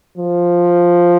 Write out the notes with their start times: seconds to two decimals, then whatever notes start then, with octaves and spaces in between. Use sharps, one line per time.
0.17 F3